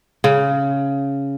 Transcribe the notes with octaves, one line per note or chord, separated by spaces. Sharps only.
C#3